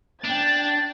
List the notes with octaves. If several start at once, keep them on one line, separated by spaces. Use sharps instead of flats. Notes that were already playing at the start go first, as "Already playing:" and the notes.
D4 G5 A6